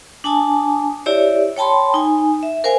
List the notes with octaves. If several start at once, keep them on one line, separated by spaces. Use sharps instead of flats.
D4 G#5 A5 D#6
E4 G4 C#5 D5 E5
C#5 G5 A5 B5 C6
D#4 G#5
E5
A#4 C5 F5 G#5